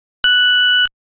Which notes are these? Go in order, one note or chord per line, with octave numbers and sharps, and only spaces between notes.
F#6